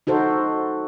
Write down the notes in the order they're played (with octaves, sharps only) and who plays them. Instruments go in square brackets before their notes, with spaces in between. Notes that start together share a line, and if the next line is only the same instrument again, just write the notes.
[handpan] D#4 F#4 A4 C5